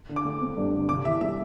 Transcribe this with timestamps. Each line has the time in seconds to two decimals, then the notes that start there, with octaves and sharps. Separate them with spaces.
0.09 D3
0.16 D6
0.25 A3
0.41 C4
0.57 G2
0.74 D3
0.89 C3 D6
1.05 E3 E5
1.21 G3 E5